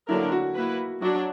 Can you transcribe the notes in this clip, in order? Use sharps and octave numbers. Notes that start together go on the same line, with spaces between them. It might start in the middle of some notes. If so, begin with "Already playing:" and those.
D3 F#3 A#3 D4 E4 A#4
F#4
A#3 E4 B4
F#3 D4 F#4